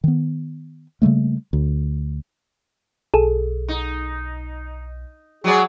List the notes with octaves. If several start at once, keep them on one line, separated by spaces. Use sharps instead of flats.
D#3 B3
C#3 G3 A3 A#3
D2
B1 G#4 A4
D#4
F#3 G#3 G#4 D5